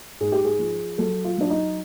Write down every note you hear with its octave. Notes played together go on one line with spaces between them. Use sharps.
G#2 G#4
G4
G#4
F3
F#3 A4
F4
F#3 D4
D#4